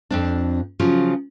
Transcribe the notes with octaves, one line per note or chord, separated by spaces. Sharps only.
F2 C4 D4
C#3 F3 F#3